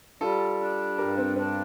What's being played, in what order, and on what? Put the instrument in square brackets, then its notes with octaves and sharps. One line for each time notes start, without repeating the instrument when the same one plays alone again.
[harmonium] G3 [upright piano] F4 A4
[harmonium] D4
[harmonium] G2 [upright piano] G4 A#4
[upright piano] C4
[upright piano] C4 [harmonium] D4